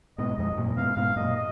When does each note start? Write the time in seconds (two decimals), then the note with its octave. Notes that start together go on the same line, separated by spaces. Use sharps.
0.18 G#2 B2 D#5
0.38 F2 G#2 D#5
0.52 G#2
0.57 F#2 A#2
0.77 G#2 B2 F5
0.96 G#2 B2 F5
1.16 F#2 A#2 D#5
1.36 D#5